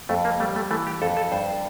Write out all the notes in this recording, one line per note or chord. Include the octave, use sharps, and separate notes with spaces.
F2 A3
A#3
G3 A3
A3
E3 A3
G4
F2 A4
A4
G2 C5